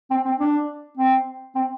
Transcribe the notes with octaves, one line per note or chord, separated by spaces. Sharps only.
C4
C4
D4
C4
C4